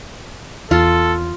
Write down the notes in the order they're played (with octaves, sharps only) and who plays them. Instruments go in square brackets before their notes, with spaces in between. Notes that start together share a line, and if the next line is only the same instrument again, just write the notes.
[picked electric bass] E2 [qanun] F4 [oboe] A4